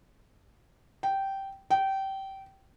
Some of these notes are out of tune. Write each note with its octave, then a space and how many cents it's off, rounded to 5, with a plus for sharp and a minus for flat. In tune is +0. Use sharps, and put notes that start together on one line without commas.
G5 -10
G5 -20